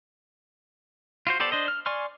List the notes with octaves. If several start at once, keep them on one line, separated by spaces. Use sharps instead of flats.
F4 F#4 C5
B3 G4 A4 C5 D5
D4 C5 D#5
F6
D5 G#5 C6 C#6 F6